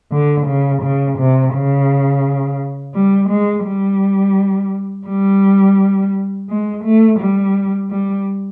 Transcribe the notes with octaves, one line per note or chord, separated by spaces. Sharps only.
D3
C#3
C#3
C3
C#3
G3
G#3
G3
G3
G#3
A3
G3
G3